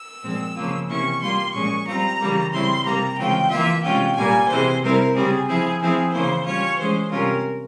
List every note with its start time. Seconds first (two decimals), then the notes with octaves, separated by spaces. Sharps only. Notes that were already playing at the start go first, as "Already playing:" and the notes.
Already playing: E6
0.23 A#2 F3 G#3 C4
0.56 C#3 F3 A#3 F4
0.89 C3 E3 A#3 C#4 E4 C#6
1.21 G3 A#3 F4 C6
1.54 A#2 F3 G#3 C#4 C#6
1.87 G3 C4 F4 A#5
2.20 C#3 E3 G3 A#3
2.53 C#3 G3 C4 E4 C6
2.85 C3 G3 A#3 A#5
3.18 C#3 E3 G#3 C4 F4 G5
3.51 E3 A#3 F4 E5
3.84 C3 E3 G#3 C#4 F4 G5
4.16 A#2 G3 A#3 G#5
4.49 C3 E3 G#3 C5
4.82 C3 G3 C4 E4 A#4
5.15 C#3 G3 C4 G#4
5.47 F3 C4 E4 G#4
5.80 F3 C4 E4 G#4
6.12 C#3 E3 A#3 E4 C5
6.45 G3 C#4 F4 C#5
6.78 E3 G#3 C#4 C5
7.11 C3 G3 C#4 F4 A#4